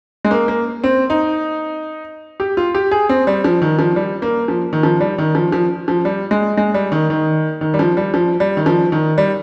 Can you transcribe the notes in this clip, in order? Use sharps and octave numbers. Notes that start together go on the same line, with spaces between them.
G#3
A#3
A#3
C4
D#4
G4
F4
G4
G#4
C4
G3
F3
D#3
F3
G3
A#3
F3
D#3
F3
G3
D#3
F3
F3
F3
G3
G#3
G#3
G3
D#3
D#3
D#3
G3
F3
G3
F3
G3
D#3
F3
D#3
G3